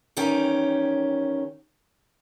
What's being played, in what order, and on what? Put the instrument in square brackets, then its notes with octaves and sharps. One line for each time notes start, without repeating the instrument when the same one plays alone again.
[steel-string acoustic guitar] E2 D#3 C#4 G4